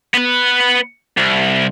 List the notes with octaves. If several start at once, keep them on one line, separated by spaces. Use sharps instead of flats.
B3 B4
C2